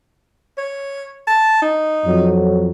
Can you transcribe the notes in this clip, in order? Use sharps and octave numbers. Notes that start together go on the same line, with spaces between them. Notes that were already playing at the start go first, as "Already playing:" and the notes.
C#5
A5
D#4
F2 F#3